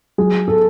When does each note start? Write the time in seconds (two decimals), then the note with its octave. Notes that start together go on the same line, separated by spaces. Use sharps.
0.18 F#3 G#4
0.48 A4